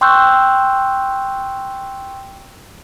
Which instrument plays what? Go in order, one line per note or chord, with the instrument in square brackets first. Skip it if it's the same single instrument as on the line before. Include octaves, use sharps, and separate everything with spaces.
[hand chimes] G5 C6 C#6 E6 F#6 G6